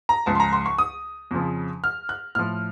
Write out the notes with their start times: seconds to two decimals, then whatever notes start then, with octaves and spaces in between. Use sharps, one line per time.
0.09 A#5
0.26 C#2 C#3 F3 A5
0.35 C6
0.40 A#5
0.53 C6
0.66 C#6
0.78 D#6
1.31 F2 C#3 F3
1.84 F6
2.09 F#6
2.35 A2 F3 F6